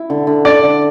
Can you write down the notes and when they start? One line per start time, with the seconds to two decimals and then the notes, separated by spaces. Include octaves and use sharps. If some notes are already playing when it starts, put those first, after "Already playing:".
Already playing: E4
0.10 D3
0.27 D3
0.45 D3 D5
0.63 D3